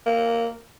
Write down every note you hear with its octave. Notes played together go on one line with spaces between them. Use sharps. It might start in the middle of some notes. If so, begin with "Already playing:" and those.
A#3